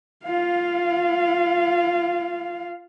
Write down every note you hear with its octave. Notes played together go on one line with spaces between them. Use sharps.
F4 F5